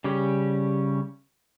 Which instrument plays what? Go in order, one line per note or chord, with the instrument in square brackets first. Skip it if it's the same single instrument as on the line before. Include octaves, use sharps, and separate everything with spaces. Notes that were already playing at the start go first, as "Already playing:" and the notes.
[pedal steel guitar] C#3 G3 C#4 G4